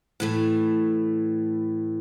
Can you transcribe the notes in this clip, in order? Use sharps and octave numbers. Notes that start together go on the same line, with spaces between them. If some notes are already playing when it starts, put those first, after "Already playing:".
A2 E3 A3